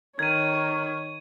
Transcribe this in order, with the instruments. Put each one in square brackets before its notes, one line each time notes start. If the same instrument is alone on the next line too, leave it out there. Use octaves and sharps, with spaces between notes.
[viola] D#3 C#5 [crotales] G#6 D#7